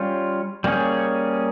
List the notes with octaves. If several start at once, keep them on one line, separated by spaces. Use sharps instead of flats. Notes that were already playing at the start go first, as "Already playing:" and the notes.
Already playing: G3 C#4 F4
G3 A#3 C#4 G#4